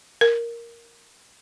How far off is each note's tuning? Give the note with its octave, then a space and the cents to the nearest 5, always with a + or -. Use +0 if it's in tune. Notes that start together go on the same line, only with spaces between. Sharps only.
A#4 +0